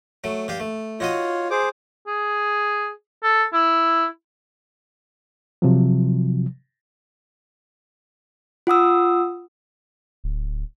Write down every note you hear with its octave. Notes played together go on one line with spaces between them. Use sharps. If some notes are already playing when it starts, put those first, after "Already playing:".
F#3 A3
G2 G4 F5
A3
D#4 F4 F#4 C#5 D#5
G#4 C5 D6
G#4
A4
E4
C3 F3 F#3
F4 F#5 D#6 E6
D1